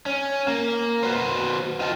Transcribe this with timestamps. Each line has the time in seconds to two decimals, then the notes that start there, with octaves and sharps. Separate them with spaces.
0.06 C#4
0.48 A#3
1.03 F#4 B4 C5
1.80 F4 D#5 F5 G5 A5